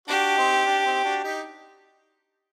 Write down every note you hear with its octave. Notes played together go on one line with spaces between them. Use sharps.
D4 F#4 G4
C4 D#4
D4
C4 D#4
D4 F#4
D#4 G4